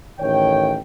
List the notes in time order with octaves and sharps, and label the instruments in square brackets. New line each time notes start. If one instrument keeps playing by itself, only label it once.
[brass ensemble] A1 D#3 C#5 G5